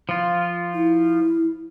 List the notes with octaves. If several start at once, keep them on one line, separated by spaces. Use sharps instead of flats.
F3 F4
E4